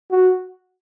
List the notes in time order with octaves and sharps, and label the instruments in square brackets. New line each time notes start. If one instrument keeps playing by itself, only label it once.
[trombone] F#4